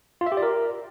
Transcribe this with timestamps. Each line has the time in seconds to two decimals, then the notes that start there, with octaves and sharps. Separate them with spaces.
0.21 F4
0.26 E5
0.32 G4
0.37 D5
0.42 A#4